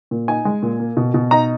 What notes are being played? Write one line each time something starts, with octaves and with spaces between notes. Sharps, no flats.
A#2
D#4 G#5
G#3
A#2
A#3
B2
B2
D#4 A#5